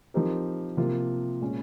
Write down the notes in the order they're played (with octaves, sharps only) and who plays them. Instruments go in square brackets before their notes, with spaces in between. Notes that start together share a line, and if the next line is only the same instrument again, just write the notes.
[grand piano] F3 C4 D#4 G4 A#4
C3 F3 A#3 F4
A#2 G#3 C#4